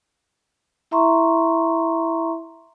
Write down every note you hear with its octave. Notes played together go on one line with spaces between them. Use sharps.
E4 E5 A#5 C6 C#6